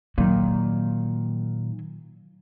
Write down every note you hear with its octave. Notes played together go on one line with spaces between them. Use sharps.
A#2 D#3 F#3